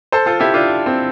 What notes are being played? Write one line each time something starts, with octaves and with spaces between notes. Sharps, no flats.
A4 C5
F4 A4
E4 G4
D4 F4
C4